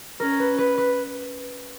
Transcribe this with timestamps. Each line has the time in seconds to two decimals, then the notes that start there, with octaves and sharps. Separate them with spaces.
0.20 C#4 A#4
0.39 B4
0.58 B4
0.78 B4